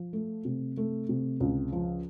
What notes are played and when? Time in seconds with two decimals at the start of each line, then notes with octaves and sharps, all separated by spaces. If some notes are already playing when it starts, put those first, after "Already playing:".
Already playing: F3
0.13 A3
0.45 C3
0.77 A3
1.09 C3
1.40 C#2
1.72 F3